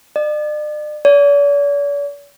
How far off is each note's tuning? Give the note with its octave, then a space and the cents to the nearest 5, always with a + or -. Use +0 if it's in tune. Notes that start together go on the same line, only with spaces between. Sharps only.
D5 +40
D5 -45